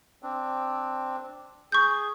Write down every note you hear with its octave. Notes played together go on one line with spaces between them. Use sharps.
C4 D4
G#4 C#6 G6